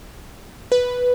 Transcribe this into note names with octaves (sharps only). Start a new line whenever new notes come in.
B4